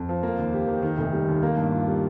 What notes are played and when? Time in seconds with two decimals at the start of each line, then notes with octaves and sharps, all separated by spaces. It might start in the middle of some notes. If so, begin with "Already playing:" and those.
Already playing: F2
0.09 F3
0.23 A#3
0.39 D#2
0.54 G4
0.67 D#3
0.82 D#3
0.97 F1
1.13 G3
1.28 D#2
1.43 A#3
1.57 G2
1.72 F4
1.88 G3